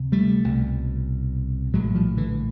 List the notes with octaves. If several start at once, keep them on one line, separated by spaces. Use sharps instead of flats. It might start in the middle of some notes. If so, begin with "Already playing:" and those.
Already playing: D2 C3
G3 A3
C2 B2
A#1 A2 F#3 G#3
F3 G3
D3 E3